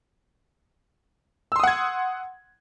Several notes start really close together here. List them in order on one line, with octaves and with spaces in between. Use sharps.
E6 C6 D#6 F#5 G#6